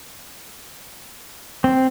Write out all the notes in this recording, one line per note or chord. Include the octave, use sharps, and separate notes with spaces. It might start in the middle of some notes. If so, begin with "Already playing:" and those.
C4